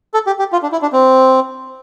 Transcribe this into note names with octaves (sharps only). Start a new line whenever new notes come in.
A4
G4
G4
F4
D4
E4
D4
C4